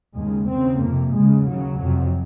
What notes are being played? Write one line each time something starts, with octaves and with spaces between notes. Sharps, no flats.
D#2 C#3 G#3
D#2 C#3 C4
F2 C3 A#3
D#2 C#3 G#3
D#2 C#3 F#3
F2 C3